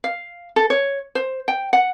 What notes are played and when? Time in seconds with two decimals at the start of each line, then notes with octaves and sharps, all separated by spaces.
0.04 F5
0.56 A4
0.70 C#5
1.15 C5
1.48 G5
1.73 F#5